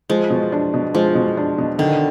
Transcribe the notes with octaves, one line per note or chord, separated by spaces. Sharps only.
F3 G#3
B2
D4
B2
F3 G#3
B2
D4
B2
D3 D#3